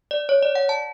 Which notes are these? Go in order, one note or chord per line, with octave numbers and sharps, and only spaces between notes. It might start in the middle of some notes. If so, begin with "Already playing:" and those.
D5
C#5
D5
F#5
A5